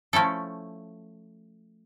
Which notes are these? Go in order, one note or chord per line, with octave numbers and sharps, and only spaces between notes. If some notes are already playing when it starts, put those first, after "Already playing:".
F3 A3 C#4 E4 A4